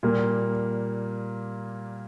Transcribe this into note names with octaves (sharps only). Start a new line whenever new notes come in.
A#2 G3 A#3